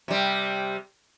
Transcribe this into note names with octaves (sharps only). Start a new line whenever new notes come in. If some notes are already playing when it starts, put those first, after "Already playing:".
C3 G3